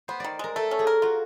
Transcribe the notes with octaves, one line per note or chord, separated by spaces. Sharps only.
B3 C5
D#3 D5
G#3 A#4
A3 A4
C#4
G#4
A#4
F4 F#4